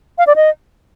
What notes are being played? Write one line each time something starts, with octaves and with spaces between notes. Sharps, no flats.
F5
D5
D#5